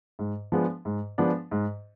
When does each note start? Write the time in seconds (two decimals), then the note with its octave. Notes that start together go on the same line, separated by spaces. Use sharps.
0.19 G#2
0.52 F3 G#3 B3 D4
0.85 G#2
1.18 F3 G#3 B3 D4
1.51 G#2